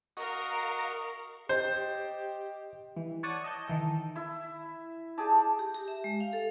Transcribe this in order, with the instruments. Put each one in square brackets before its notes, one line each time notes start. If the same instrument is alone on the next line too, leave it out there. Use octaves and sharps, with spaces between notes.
[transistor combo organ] F#4 D#5 C#6 [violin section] A#4 F5
[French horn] G4 [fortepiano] C5 [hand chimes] D#5
[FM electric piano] E3
C#5 D5 F#5 A5 C#6 D#6
D#5 A5 G6
D#3 E3 A4
[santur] E4 E5
G4 G#4 D5 A5
[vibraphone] G4
G4
E5
G#3
F5
A4